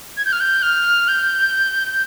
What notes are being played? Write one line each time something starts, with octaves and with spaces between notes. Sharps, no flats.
G#6
G6
F6
G6
F6
G6